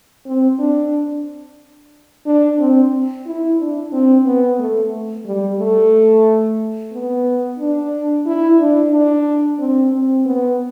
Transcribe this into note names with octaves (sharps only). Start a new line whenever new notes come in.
C4
D4
D4
C4
E4
D4
C4
B3
A3
G3
A3
B3
D4
E4
D4
D4
C4
C4
B3